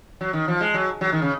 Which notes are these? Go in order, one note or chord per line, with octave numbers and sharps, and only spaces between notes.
F#3
D#3
F3
G#3
F#3
F#3
D#3
C#3